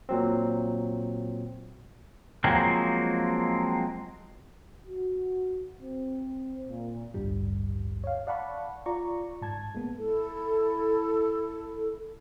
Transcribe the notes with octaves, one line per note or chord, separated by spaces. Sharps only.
A#2 F#3 C4
F3 F#3 G#3 A#3 C4
F#4
C4
A#2
A1 D2 G2 G3
C#5 F5
D5 F5 F#5 A5 B5 C#6
F4 D5 A#5 C#6
G#2 A5 G#6
G#3 A#3 B3
E4 A4